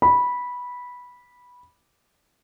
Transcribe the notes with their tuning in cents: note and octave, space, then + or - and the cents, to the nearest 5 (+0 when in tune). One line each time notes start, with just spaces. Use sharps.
B5 -10